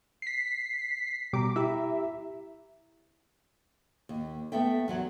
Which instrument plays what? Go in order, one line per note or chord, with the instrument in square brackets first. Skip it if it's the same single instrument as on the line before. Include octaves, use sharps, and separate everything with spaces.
[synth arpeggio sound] B6 C7
[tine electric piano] B2 A#5 [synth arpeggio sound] G3 D6
[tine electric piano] E4 G4 A#5 [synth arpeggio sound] E5
[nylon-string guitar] D#2
A3 B3 A4 E5 G5
E2 F#3 F#5